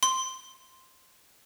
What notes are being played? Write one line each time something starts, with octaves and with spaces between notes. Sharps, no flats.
C6